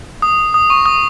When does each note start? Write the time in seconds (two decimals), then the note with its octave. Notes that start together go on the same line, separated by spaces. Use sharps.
0.22 D#6
0.54 D#6
0.70 C#6
0.86 D#6